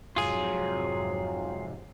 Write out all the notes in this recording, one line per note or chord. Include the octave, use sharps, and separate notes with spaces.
F2 G#2 C3 F#3 F4 G#4